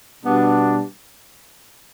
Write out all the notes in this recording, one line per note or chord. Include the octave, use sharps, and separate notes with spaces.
B2 G3 B3 D4